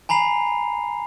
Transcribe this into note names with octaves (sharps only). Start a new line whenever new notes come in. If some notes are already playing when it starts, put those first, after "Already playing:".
G#5 A#5 B5 C7 F7